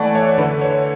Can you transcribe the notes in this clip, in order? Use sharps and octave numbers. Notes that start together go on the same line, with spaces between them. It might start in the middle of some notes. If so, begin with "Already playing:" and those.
Already playing: E3 A3 D5 F#5 A5 C#6
C#5 E5
D3 B4
C#5